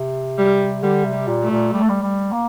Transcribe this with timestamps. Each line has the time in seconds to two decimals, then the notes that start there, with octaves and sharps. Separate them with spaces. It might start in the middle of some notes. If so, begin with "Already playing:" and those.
Already playing: C3
0.39 G3
0.83 D3 G3
1.05 C3
1.12 G3
1.28 A#2
1.43 A3
1.50 A#2
1.73 G3
1.82 A3
1.89 G3
2.02 G3
2.32 A#3